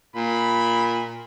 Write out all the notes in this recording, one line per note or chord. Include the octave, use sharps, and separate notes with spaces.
A#2 B5